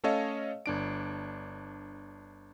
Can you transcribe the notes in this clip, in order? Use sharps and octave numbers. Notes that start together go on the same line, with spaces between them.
A3 C#4 A4 C#5 D#5 F5
G1 D4 D7